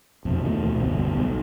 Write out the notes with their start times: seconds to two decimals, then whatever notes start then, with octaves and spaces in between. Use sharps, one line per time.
0.25 F2 B2
0.45 D#2 B2 E3 A3
0.79 F1 D2 G2 B3
1.16 B1